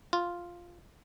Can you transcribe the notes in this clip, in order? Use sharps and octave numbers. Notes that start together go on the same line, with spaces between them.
F4